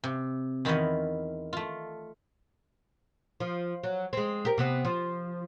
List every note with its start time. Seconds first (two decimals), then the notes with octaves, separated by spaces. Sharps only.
0.04 C3
0.65 E2 D#3 E4 F4 C#5 D#5
1.53 A3 F4
3.40 F3
3.84 F#3
4.13 G#3 C4
4.45 G4 A#4
4.58 C3 B3 C4
4.85 F3